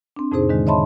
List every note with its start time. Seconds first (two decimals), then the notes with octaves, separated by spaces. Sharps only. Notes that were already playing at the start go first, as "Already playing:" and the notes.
0.16 C4 D4
0.32 F2 A2 C3 D#4 G#4 C5
0.49 D3 D#3 G#3
0.67 C#5 D#5 E5 A5 B5 C6